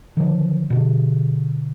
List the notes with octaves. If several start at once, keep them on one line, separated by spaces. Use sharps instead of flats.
D3 D#3 F3 F#3
B2 D3